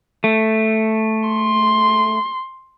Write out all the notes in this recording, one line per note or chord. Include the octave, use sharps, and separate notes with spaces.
A3
C6